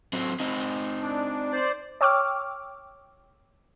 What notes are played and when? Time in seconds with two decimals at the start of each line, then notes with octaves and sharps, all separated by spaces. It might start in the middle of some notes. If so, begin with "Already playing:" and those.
0.13 F#3 C4
0.40 C4 D#4
1.02 D4
1.52 C5 D5
2.01 C#5 G5 C#6 D6 E6 F6